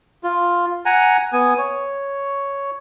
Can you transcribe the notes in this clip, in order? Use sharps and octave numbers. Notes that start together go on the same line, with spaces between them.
F4
F#5 G#5 A#5
B3 G#5
C#5